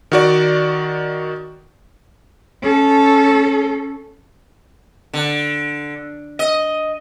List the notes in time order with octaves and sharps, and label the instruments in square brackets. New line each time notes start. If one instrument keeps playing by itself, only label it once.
[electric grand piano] D#3 F#4 D5
[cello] C#4 A4
[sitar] D3
D#5